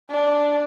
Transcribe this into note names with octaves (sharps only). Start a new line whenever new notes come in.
D4